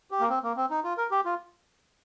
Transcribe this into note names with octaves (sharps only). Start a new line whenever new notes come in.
G4
A#3
C4
A#3
C4
D#4
F4
A#4
G4
F4